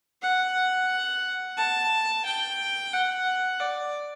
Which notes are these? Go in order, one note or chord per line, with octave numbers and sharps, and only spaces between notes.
F#5
A5
G5
F#5
D5